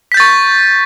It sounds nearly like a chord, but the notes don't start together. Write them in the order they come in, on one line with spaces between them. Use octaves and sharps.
B6 G6 A6 C#6